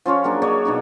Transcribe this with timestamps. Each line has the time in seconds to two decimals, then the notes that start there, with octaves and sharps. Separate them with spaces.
0.06 F3 C#4 F4 C#5
0.24 F#3 A#3 D4 G#4
0.42 A#3 D4 C#5 D#5
0.65 B2 D4 D#4